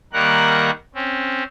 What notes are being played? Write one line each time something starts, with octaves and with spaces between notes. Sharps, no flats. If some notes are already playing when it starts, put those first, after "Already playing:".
D#3 G3 A#3 A#4 F#5 F#6
C4 C#4